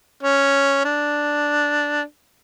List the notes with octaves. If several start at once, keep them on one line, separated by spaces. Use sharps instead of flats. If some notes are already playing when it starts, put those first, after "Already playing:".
C#4
D4